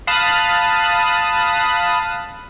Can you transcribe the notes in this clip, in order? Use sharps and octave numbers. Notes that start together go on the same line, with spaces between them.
F5 A5 B5 D#6 F#6